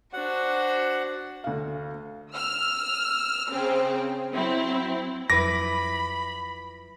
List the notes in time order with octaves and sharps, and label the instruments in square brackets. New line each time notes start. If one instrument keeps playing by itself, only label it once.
[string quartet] D4 F#4 C5 [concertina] F#5
[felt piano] D2 F5
[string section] E6 F6
C#3 C4
F#3 C4 E4
[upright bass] F2 F#3 [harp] E4 B4 D6 [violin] B5 [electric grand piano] A#6